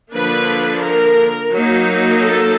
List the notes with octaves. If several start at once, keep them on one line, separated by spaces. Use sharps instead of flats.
D3 F3 A#3 D4 B4
A#4
F#3 A#3 D#4
A4